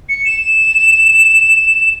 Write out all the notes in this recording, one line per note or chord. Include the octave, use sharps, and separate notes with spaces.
C#7
E7